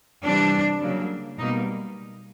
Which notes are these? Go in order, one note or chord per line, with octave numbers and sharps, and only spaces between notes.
C3 E3 G3 D4
C#3 F#3 A#3
B2 G3 A#3 D#4